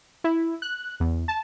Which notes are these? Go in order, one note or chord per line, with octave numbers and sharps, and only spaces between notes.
E4
F#6
E2
A5